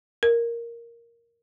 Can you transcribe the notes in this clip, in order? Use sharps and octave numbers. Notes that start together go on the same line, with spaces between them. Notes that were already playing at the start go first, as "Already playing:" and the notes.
A#4